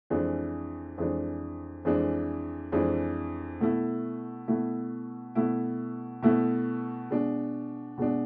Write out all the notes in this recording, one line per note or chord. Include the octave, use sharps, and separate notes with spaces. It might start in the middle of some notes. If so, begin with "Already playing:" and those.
F2 E3 G#3 D4
F2 E3 G#3 D4
F2 E3 G#3 D4
F2 E3 G#3 D4
B2 A3 E4
B2 A3 E4
B2 A3 E4
B2 A3 E4
B2 G#3 D4
B2 G#3 D4